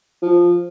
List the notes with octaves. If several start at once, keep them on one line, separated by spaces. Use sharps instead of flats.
F3